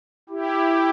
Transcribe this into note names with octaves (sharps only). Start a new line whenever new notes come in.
E4 G4